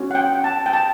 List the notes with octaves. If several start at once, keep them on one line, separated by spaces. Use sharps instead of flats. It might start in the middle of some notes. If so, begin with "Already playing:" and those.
Already playing: C#4 F#4
F#5
G5
A5
G5
A5